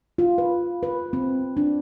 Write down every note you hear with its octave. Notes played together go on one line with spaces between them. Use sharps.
F4
B4
B4
C4
D4